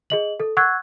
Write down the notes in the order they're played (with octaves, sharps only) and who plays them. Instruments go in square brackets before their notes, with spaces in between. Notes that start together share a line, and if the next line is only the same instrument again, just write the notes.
[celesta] G#4 D#5 F#7
A4
F#5 C#6 E6 F#6 G#6